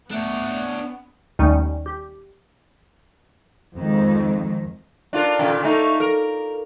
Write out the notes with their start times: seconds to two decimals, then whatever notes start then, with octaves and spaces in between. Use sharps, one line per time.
0.11 A3 B3 D4 C#5
1.39 D#2 D#3 G3 A3 C#4 D#4
1.86 G4
3.76 F2 D#3 G#3
5.13 D4 F4 A#4
5.39 A#2 C#3
5.64 A3 A#3 D#4
6.00 A#4